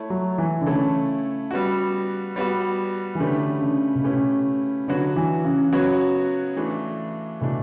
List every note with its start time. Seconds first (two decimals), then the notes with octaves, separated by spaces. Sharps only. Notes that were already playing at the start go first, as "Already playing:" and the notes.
Already playing: A3 E4 A4 C#5
0.10 F#3
0.38 E3
0.61 D3
0.66 C#3 A3 E4 A4 C#5
1.51 G3 B3 F#4
2.36 G3 B3 F#4
3.15 E3
3.19 D3 A3 C#4 E4 G4 B4
3.61 C#3
3.95 B2
4.04 C#3 A3 C#4 E4 G4 B4
4.88 D3 F#3 B3 F#4 C#5
5.16 E3
5.45 C#3
5.73 F#3 B3 F#4 C#5
6.56 E3 A3 D4
7.41 B2 E3 A3 D4